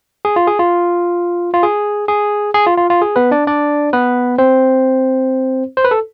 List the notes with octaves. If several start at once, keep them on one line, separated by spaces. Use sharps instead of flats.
G#4
F4
G#4
F4
F4
G#4
G#4
G#4
F4
F4
F4
G#4
B3 B4
D4 D5
D4 D5
B3 B4
C4 C5
C5
B4
A4